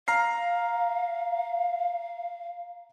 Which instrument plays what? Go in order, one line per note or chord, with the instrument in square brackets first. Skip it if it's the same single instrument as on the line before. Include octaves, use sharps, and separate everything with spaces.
[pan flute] F5 [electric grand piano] A#5 F6 C7